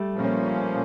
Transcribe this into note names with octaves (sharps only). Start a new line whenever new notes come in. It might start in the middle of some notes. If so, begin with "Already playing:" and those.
Already playing: G3 A3
A#2 F3 A#3 C#4